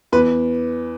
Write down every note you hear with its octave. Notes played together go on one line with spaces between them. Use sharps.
E2 B4